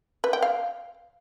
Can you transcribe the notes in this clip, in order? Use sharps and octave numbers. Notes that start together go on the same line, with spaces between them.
B4
G5
F5